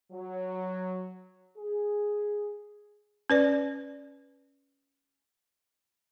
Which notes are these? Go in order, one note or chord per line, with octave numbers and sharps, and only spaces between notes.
F#3
G#4
C#4 B4 D5